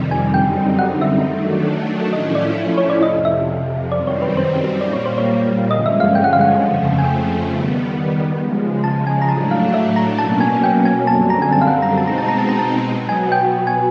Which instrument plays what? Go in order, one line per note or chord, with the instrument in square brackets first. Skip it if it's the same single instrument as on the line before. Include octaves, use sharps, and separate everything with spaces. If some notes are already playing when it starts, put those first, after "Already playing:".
Already playing: [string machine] F2 C3 D#3 G3
[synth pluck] G#5
[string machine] F#2 D3 G3 C4 D#4 [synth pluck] G5
[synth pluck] F#5
E5
[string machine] D#3 F#3 A3 D4
[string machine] A2 F3 A3 C#4 E4 [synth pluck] D#5
[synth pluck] D5
C#5
D5
[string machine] F2 C3 F3 [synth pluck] D#5
[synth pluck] E5
[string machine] F#2 D#3 G3 C4 [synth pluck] D5
[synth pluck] C#5
B4
C5
[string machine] A#2 G3 A#3 [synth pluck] D5
[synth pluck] C#5
C5
C#5
[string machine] G2 D3 F3 G#3 C#4 [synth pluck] D#5
[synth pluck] E5
F5
G5
F#5
F5
F#5
[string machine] F2 C#3 F3 A3
[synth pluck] G#5
G5
[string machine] D#3 G3 B3
C#3 F3 G#3
[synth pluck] A5
G#5
A#5
[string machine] A2 F#3 A3 D4 [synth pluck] A5
[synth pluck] F5
E5
A#5
[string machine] B2 F#3 A#3 C#4 [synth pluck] A5
[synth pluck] G#5
G5
G#5
[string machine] F#2 D3 G3 C4 [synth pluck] A5
[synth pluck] A#5
G#5
A5
F5
F#5
A#5
[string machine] B2 G#3 C4 D#4 [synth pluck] A5
[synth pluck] A#5
A5
A#5
A5
A#5
A5
[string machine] B2 F#3 B3
[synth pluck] G#5
G5
G#5